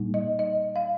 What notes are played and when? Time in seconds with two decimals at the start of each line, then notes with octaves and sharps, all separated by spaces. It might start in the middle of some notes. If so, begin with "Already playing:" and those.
Already playing: A#2 G3 A#3 D#4
0.14 D#5
0.39 D#5
0.76 F5